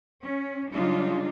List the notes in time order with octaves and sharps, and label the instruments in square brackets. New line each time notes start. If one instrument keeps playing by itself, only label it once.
[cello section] C#4
C#3 F#3 G3 D4 D#4 F4